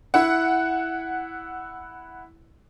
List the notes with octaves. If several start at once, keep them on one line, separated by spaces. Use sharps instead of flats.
E4 F#5